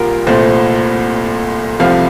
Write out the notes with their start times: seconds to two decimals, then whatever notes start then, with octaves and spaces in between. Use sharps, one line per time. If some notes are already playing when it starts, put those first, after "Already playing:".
Already playing: C2 A#2 A#3 F4 G4 A#4
0.27 C2 A#2 A3 C5
1.80 C2 C3 F3 A3 F5